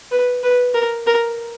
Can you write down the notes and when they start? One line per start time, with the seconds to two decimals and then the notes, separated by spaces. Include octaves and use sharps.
0.11 B4
0.43 B4
0.74 A#4
1.07 A#4